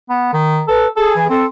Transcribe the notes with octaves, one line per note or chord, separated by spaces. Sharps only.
B3
D#3
A4 B4
G#4 A4
E3
C4 A4